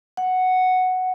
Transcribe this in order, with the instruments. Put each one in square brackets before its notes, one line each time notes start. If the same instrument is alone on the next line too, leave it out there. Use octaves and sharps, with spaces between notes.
[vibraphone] F#5